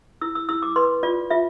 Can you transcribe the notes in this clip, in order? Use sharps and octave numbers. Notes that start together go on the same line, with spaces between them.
E4 E6
E6
E4 E6
D6
B4 C6
F4 D5
F4 E5